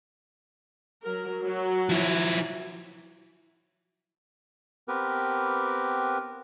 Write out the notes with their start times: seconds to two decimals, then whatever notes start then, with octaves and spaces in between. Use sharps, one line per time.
1.03 F#3 A#4
1.45 F#3
1.89 F3 E4
4.88 B3 C4 G4 A#4 B4